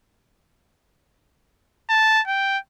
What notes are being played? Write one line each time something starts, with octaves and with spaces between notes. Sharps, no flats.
A5
G5